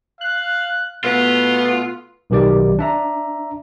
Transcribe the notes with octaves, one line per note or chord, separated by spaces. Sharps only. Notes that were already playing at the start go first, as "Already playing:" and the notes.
F5 F#6
B2 A3 B3 F4
B1 D#3 G4 D5
D4 E5 A#5